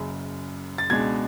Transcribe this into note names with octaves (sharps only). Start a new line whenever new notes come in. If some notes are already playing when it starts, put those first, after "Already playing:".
Already playing: F#1 F#2 C#3
A6
C#2 B2 G#3 D4 G#6